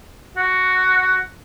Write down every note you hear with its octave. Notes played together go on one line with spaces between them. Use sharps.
F#4